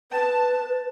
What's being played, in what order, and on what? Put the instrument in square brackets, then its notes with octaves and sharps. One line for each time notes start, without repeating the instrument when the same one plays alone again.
[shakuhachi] B4 [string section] A5